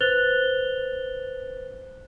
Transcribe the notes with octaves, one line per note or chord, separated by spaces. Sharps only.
B4 C5 F#6 A6 F7 G7